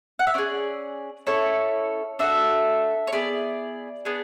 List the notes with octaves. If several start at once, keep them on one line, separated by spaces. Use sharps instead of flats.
F#5
E5
C#4 G#4 D5
C#4 E4 A4 C#5
D4 F#4 A4 E5
C#5
B3 E4 G#4 D5
B3 D4 G#4